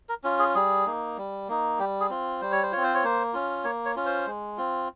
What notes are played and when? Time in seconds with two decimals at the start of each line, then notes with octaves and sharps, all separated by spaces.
0.09 A#4
0.24 C#4 F4
0.39 G#4
0.55 G3 G#4
0.86 A#3 D#4
1.17 G3
1.49 A#3 D#4
1.79 G3 G4
2.00 G#4
2.10 C4 F4
2.41 G3 C5
2.52 C#5
2.63 C5
2.72 C4 F4 C#5
2.83 C5
2.94 C#5
3.04 A#3 C5
3.34 C#4 F4
3.64 A#3 C#5
3.86 C#5
3.96 C#4 F4
4.06 C5
4.27 G#3
4.57 C4 F4